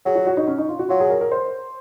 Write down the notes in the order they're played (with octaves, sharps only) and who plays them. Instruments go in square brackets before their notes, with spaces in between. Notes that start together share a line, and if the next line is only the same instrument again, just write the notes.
[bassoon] F#3 [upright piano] G#4
[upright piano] F#4
F#4
D#4
C#4
D#4
F4
F#4
[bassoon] F#3 [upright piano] F4
[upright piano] G#4
A#4
A#4
C5